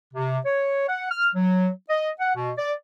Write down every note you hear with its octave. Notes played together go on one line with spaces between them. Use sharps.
C3
C#5
F#5
F6
F#3
D#5
F#5
B2
D5